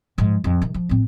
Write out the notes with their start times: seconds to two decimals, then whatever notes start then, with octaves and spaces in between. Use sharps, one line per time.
0.18 G#2 F3
0.44 F2
0.62 C3 D#3
0.74 F3
0.89 A2 C4